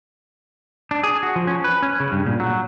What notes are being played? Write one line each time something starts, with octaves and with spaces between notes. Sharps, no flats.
D4
G#4
F#4
F3
C#4
B4
C#4
C#3
G2
A#2
F#3